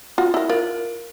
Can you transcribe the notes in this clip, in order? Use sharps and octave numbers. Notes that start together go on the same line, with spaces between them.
F4 F#4
E4 A#4
F4 A#4